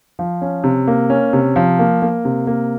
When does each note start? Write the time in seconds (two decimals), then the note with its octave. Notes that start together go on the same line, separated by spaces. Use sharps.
0.19 F3
0.42 C#4
0.64 C3
0.87 A#3
1.10 C#4
1.33 C3
1.56 F3
1.79 A#3
2.02 A#3
2.25 C3
2.47 A#3